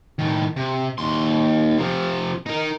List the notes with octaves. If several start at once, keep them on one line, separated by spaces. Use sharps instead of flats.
A2 D#3
C3
D#2 C6
C3 F3
D#4 A#4